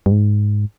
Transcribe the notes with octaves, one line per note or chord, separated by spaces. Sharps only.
G2
G#2